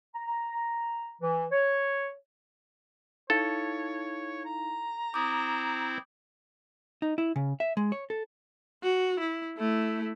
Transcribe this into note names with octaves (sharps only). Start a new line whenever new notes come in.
A#5
E3
C#5
D#4 E4 A4 C#5 F5
A#5
C4 E4 C5 D6 D#6
D#4
E4
C#3
E5
G#3
C#5
A4
F#4
E4
A3 E4